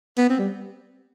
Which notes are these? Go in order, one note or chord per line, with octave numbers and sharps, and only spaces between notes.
B3
C4
G3